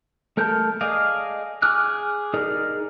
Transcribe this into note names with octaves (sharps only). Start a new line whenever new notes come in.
A3 A#4 A5 G6
G#4 D5 D#5 F5
G#4 D6 F6 F#6
D#4 G#4 A#4 D5